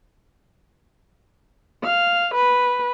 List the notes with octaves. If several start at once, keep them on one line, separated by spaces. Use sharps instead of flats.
F5
B4